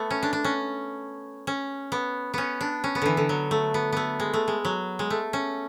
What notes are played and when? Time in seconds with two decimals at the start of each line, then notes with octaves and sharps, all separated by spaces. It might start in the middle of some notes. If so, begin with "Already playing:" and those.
Already playing: A3 B3
0.11 C#4
0.23 D4
0.33 D4
0.44 C#4
1.47 C#4
1.92 B3
2.34 B3 C#4
2.61 D4
2.84 C#4
2.95 B3
3.02 D3 E3
3.17 D3
3.29 F#3
3.51 A3
3.74 B3
3.93 A3 B3
4.20 G#3
4.34 A3
4.48 G#3
4.65 F#3
4.99 G#3
5.10 A3
5.33 C#4